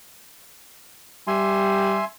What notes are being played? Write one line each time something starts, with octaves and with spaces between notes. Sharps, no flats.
G3 E5 G#5 C6